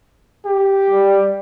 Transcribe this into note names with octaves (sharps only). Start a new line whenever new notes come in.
G4
G3